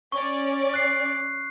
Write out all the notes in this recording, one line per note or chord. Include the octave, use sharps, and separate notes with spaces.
C#4 D5 C#6
F#6 C7